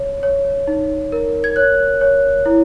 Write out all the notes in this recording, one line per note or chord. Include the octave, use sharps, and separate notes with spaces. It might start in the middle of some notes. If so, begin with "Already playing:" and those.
Already playing: C#5
C#5
D#4
A#4
G#6
C#5 F#6
C#5
E4